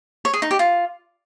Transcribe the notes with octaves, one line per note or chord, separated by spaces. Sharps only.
C#5
G#4
D#4
G4
F4